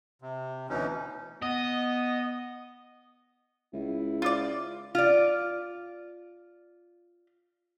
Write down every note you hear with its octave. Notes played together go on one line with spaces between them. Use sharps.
C3
D2 B2 E3 C#4 D#4
B3 D#5
C#2 E4
F4 D5 D6 F6
F4 D5